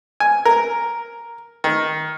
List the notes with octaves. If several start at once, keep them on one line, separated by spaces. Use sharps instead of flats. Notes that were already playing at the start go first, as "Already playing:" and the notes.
G#5
A#4
D#3